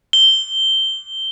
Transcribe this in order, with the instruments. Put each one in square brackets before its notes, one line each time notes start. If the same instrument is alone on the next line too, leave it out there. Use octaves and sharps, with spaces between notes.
[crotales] G7